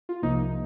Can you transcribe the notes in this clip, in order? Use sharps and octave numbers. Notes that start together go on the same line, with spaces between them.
F4
C2 C3 F3 A#3 D#4